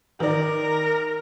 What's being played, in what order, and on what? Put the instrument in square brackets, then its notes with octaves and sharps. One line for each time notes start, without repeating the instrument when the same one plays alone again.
[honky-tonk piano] D#3 D5 [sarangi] A#4